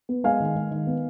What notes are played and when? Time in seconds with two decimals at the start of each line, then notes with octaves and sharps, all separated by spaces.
0.09 B3
0.24 G#3 F5 G#5
0.40 D#3
0.55 G#3
0.71 D#3
0.87 B3